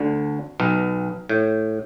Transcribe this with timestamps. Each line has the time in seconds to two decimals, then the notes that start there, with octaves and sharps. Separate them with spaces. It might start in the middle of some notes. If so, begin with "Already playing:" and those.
Already playing: D2 D3
0.60 B1 B2
1.29 A2